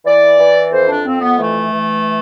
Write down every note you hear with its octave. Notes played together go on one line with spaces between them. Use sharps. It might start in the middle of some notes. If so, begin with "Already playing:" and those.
E3 D5
E3
F2 C5
D4
F2 C4
B3
E3 A3
E3